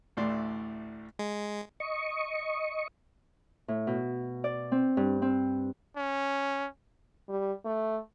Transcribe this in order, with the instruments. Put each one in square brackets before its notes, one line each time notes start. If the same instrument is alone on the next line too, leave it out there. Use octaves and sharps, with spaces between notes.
[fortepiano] A1 D2 A2 E4 D5 C6
[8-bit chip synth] G#3
[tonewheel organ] D#5 C#6
[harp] A2
B2
D5
C4
G2
C4
[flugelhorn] C#4
[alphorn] G3
A3